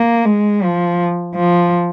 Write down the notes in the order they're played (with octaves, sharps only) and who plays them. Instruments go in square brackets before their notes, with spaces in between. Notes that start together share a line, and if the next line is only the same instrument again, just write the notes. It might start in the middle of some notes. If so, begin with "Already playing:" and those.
Already playing: [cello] A#3
G#3
F3
F3